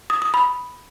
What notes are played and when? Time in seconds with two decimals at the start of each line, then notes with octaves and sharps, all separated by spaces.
0.10 D#6
0.22 D#6
0.34 B5